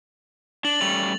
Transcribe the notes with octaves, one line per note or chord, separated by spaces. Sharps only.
D4 A6 F#7
G3 A3 C#4 F7